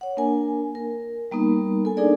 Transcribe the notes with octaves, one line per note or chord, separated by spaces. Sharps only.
C#5 F#5
A#3 D4 A#4 G#5
A#4
G3 A#3 B3 D#4 A#4
A4 G#5
D4 D#4 G#4 A#4 D5